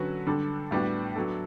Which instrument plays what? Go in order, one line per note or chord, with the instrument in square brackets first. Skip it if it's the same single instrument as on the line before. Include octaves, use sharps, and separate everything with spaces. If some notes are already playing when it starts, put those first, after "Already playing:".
Already playing: [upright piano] D3 F#3 C#4 F#4 B4
D3 G3 D4 A4
A2 G3 B3 D4 F#4
F#3 B3 D4 A4